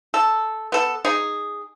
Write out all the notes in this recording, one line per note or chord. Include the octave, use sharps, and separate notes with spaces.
A4
B3 A4
D#4 G#4